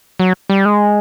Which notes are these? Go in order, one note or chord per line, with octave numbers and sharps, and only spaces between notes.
F#3
G3
G#3